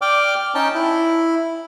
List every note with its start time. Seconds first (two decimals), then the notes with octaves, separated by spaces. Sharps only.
0.02 D5 G5 D6 F6
0.55 C#4 D#4 G5 A5
0.74 E4